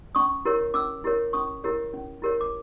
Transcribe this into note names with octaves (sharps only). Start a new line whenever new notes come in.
C#4 C#6 D#6
E4 G4 A#4 C#5
C#4 D6 E6
E4 G4 A#4 C#5
C#4 C#6 D#6
E4 G4 A#4 C#5
C#4
E4 G4 A#4 C#5
D6